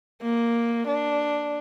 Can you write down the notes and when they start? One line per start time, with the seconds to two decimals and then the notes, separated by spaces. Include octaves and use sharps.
0.23 A#3
0.87 D4